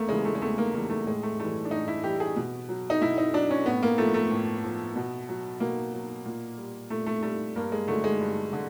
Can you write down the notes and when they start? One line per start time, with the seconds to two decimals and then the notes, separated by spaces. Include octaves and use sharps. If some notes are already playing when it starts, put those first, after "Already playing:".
Already playing: E2 A3 A#3
0.09 C#3 E3 G3 G#3
0.25 A3
0.35 G#3
0.42 E2 A3
0.58 A#3
0.74 C#3 E3 G3 A#3
0.90 A3
1.07 A2 G#3
1.23 A3
1.39 E3 G3 A3
1.65 D4
1.71 A2 D#4
1.88 E4
2.03 E3 G3 G4
2.20 G#4
2.36 B2
2.69 F#3
2.90 D#4
3.01 B2 E4
3.18 D#4
3.34 F#3 D4
3.51 C#4
3.66 A2 B3
3.83 A#3
3.98 F3 A3
4.14 A3
4.30 A2
4.64 F3
4.96 B2
5.29 F#3
5.60 B2 A#3
5.93 F#3
6.26 A#2
6.58 G3
6.90 A#2 A3
7.06 A3
7.23 G3 A3
7.56 G2 A#3
7.72 G#3
7.88 D3 F#3 A3
8.04 G#3
8.21 G2
8.53 D3